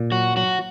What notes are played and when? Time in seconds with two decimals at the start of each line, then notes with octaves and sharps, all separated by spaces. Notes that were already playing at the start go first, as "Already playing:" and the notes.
Already playing: A#2
0.12 F#3 F#4
0.37 F#3 F#4